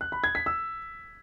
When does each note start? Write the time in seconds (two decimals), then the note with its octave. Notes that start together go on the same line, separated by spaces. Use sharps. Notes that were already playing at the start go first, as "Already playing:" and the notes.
0.01 F#6
0.12 B5
0.24 G#6
0.35 B6
0.46 E6